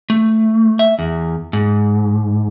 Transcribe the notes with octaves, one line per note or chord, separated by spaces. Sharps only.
A3
E5
E2
G#2